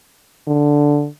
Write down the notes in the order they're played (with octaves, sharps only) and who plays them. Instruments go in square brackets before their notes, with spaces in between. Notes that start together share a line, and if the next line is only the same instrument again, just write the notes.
[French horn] D3